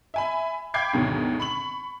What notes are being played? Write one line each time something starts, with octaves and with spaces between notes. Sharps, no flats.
E5 G#5 B5
F5 G5 B5 D6 G#6 C7
D2 G#2 B2 D#3 F#3
B5 C#6 F#7